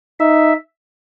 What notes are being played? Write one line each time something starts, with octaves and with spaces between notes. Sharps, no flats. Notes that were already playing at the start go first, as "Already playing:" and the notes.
D#4 E5